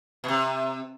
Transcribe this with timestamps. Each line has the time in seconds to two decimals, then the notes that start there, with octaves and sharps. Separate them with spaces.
0.24 B2
0.28 C3